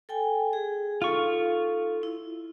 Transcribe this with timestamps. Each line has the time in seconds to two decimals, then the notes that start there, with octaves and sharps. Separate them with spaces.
0.09 A4 G5 G#5
0.53 G#4
1.02 D#4 F4 A4 F5 C#6
2.03 E4